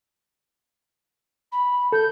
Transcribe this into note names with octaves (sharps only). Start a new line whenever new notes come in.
B5
A4 G6